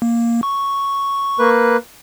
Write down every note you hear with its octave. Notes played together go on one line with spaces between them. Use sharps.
A#3
C#6
A#3 B4